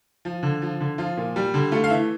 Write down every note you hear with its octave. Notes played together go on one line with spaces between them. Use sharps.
F3
D3
F3
D3
F3 F4
A#2
G3
D3
A3 F4
F5
E3 E5